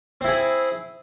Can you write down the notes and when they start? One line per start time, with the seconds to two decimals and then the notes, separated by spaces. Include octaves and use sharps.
0.21 C4
0.24 E4
0.28 G#4